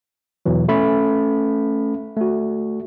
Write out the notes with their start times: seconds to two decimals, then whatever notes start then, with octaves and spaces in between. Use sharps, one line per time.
0.46 E2 B2 E3 F#3
0.68 A3 C#4 B5
2.17 A3 F#4